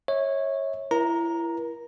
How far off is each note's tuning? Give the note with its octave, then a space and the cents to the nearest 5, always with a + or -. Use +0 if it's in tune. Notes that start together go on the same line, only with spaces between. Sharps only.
C#5 -15 E5 -35
E4 +30 A#4 +40 A#5 +0